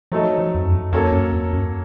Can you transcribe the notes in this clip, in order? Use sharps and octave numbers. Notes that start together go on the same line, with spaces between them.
F3 F#3 A3 D#4 A4
F3
F2
F#2
F2 F#3 A#3 C#4 A4 C#5
F#2
F2
F#2